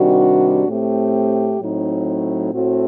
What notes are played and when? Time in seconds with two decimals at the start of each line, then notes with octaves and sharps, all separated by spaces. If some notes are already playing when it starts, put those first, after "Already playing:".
Already playing: C3 D#3 G3 D4 F#4
0.67 A2 A3 C4 G4
1.61 A2 F#3 C4 D#4
2.54 A2 A3 C4 F#4